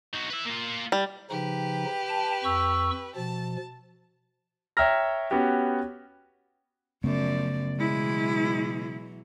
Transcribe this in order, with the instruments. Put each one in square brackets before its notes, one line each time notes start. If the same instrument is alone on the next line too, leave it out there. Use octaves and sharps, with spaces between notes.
[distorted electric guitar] D#4 F#4
B4 E5
A#3 F4
[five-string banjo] G3
[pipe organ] C#3 F3 D#4 [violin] G4 B4
[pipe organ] G5 A5
F2 C#6 E6
[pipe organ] B2 F3 [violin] A5
[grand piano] C#5 E5 G5 A#5 F6 A#6
B3 C#4 F#4 G4
[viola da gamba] F#2 F3 D5 [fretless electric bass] C#3 A3 B3
[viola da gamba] B2 E3 F#3 [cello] G#3 E4